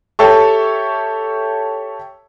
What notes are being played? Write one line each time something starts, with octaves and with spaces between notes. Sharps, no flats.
G4 A4 C#5 E5 A5 C#6